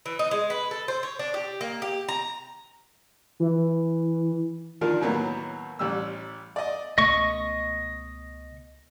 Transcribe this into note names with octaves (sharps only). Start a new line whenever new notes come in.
E3
D#4
G#3
B4
A4
C5
C#5
D4
G4
A#3
G4
A#5
E3
D#3 F3 D4 F4 A#4
D#2 A2 F#3 A#3 B3
A1 G3 E6
D5 D#5
C#2 B2 A3 D#5 C#6